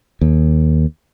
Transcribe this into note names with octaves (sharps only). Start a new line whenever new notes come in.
D#2